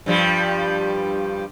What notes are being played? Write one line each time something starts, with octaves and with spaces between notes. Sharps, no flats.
G2 F3 G3